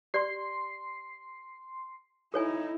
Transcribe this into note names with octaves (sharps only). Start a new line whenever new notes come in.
G4 D5 C6 C7
D#4 E4 A4 C#5 G#5